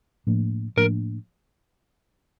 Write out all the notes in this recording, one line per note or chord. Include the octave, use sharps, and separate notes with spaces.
A2 F3 A#3 D4
A2 F3 A#3 D4 A#4